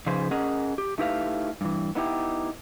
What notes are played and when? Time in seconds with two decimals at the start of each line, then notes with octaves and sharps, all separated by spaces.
0.06 C#3 F3 D#4 G#4 B4 C5
0.31 C#4 G#4 A#4 D#5 F#5
0.78 G4
0.98 A3 D#4 E4 G4 B4 F5
1.61 G2 E3
1.95 B3 D#4 E4 G4